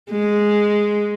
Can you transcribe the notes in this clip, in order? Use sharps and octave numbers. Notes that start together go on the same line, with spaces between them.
G#3